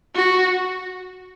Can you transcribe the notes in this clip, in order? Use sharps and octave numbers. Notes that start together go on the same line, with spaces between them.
F#4